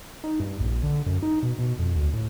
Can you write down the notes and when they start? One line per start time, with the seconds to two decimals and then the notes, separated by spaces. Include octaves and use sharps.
0.24 D#4
0.40 G2
0.60 A#1
0.83 D3
1.06 F#2
1.23 D#4
1.43 B2
1.59 B2
1.79 F2
1.95 D2
2.13 A2